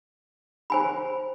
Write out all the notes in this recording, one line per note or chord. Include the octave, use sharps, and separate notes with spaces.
C5 G#5 B5